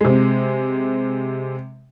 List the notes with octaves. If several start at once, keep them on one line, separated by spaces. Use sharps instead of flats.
C3 G#3